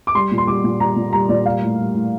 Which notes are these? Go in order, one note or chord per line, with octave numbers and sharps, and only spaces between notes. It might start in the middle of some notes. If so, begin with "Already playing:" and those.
D6
G3 C6
A#2
C6
G3 D6
A#2
G3 A#5
A#2
G3 A#5
A#2 D5
G3 F5
A2
G3
A2